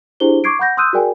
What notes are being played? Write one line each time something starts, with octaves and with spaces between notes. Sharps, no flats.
D4 E4 G4 G#4 C5 G7
C#6 D6 G#6 C7 D7
F#5 B5 G6 A#6
C6 D#6 E6 F#6 G6 D#7
F#4 G#4 A#4 D5 G5 G#5